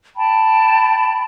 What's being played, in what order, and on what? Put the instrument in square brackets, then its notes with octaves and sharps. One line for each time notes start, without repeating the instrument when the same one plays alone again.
[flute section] G5 A5 B5